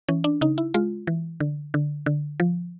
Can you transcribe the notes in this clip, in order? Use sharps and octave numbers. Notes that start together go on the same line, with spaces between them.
E3 C#4
D4
C#3 D#4
E4
G#3 F4
E3
D3
D3
D3
F3